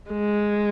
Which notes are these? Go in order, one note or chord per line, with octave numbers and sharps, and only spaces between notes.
G#3